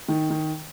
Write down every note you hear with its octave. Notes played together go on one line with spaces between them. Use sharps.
D#3
D#3